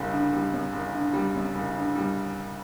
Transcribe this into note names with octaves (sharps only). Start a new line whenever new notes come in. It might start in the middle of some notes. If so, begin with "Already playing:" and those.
Already playing: F#1 F#2 G3
D3
G3
F#2
F#1
D3
G3
F#2
F#1
D3
G3